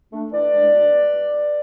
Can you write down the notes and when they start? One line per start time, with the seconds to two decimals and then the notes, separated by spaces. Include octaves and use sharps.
0.13 A3 D4
0.33 E3 B4 D5
0.54 G#3 D4
0.73 B2